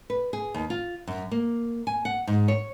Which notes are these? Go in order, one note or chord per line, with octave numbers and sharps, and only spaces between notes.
B4
G#4
D#2
F4
F#2
A#3
G#5
F#5
G#2
C#5